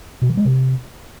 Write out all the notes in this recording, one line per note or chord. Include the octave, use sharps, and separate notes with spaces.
B2
E3
G#3
C3